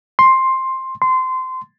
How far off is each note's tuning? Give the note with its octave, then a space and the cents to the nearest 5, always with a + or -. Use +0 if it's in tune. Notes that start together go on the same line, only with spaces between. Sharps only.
C6 +10
C6 -20